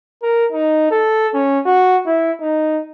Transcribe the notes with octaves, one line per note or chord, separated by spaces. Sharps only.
A#4
D#4
A4
C#4
F#4
E4
D#4